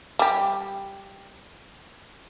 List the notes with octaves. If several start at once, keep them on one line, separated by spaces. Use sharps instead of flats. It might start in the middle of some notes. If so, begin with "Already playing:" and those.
G3 G4